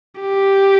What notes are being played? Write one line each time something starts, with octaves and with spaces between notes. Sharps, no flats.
G4